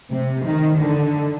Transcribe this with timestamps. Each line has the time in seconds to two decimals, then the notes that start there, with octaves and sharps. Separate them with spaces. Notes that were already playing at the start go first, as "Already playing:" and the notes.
0.12 C3
0.44 D#3
0.78 D3